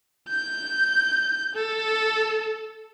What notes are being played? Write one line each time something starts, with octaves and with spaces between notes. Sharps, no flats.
G6
A4